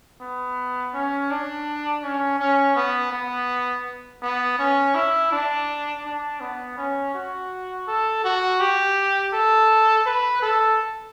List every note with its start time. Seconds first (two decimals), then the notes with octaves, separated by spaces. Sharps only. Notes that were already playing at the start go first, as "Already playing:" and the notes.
0.21 B3
0.94 C#4
1.30 D4
2.03 C#4
2.39 C#4
2.76 B3
3.12 B3
4.22 B3
4.59 C#4
4.95 E4
5.32 D4
6.05 D4
6.40 B3
6.78 C#4
7.14 F#4
7.87 A4
8.24 F#4
8.60 G4
9.34 A4
10.06 B4
10.42 A4